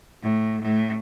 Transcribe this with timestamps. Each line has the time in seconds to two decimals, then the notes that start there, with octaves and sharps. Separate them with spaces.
0.22 A2
0.61 A2